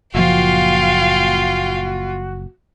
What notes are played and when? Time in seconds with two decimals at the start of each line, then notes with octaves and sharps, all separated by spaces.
0.14 F#1 A#2 F3 F4 F#4 F5 G5